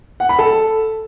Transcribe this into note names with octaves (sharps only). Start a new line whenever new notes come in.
F#5
B5
A4